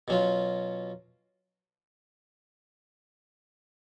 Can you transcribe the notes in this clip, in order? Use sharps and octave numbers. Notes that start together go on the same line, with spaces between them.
B2 F#3 C#4 F4